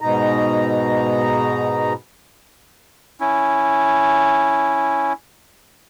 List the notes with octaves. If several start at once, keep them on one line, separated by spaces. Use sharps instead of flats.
G#2 B2 D#4 A#5
C#4 E4